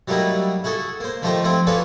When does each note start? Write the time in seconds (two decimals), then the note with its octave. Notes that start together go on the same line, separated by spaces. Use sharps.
0.08 F#3 G3 A3 A#3 D#4 E4
0.64 E4 F#4 G#4 A4
1.00 A#3 C5
1.23 D#3 F3 A3 D#4 G4 C5
1.44 F3 A3 C4 E4
1.67 F4 F#4 G#4 A4 B4 D5